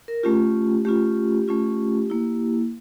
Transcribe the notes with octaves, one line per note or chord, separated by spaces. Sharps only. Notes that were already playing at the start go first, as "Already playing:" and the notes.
A#4
A3 C#4 F4 G4
A3 C#4 F4 G4
A3 C#4 F4
A#3 E4